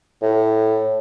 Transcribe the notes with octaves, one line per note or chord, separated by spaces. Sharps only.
A2